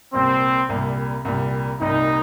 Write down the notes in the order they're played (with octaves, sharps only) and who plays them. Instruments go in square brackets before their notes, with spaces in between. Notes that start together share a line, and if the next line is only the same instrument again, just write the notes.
[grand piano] C2 A#2 G3 [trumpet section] C4
[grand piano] C2 A#2 G3
C2 A#2 G3
[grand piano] C2 A#2 G3 [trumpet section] D#4